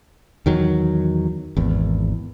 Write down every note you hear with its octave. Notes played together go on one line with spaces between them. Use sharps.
E2 D#3 F#3
G#1 E2